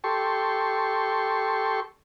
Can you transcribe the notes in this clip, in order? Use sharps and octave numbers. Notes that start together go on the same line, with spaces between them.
G4 A4 C6 C#6